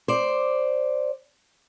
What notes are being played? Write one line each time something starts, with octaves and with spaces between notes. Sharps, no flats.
C5 D5